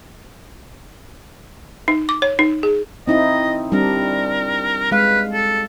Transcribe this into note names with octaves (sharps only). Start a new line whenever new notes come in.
D#4
D6
C#5
D#4
G#4
C4 D#4 E4 D#5
G3 C4 D4 A#4
G#3 B4 F5
A4